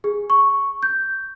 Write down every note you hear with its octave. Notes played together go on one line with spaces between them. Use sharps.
G#4
C#6
G6